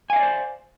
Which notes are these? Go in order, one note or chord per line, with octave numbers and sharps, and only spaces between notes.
C5 D5 D#5 F5 G#5